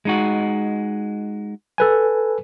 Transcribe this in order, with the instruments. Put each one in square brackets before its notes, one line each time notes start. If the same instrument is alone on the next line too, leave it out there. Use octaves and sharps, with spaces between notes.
[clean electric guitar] G#3 D#4 F#4
[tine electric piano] A4 B4 G#5